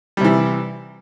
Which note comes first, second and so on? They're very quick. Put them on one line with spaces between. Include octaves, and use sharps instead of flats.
G3 C3 E3